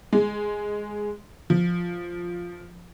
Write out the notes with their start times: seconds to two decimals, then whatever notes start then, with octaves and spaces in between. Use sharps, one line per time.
0.13 G#3
1.50 F3